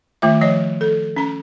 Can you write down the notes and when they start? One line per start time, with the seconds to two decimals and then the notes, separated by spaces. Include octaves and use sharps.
0.22 D#3 A3 F4 E5
0.41 F3 C#5 D#5
0.81 A4
1.16 C#4 A#5